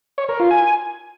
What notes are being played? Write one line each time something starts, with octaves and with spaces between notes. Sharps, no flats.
C#5
A#4
F4
G#5